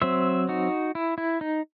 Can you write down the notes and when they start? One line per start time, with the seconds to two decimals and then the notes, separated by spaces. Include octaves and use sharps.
0.02 F#3 C4 C5 E5
0.49 D#4 F#4
0.95 E4
1.18 E4
1.41 D#4